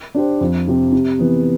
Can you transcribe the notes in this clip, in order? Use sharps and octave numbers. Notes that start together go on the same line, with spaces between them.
D4 G4 C5
F2
C3 F3 C4 G4
C3
E3 B3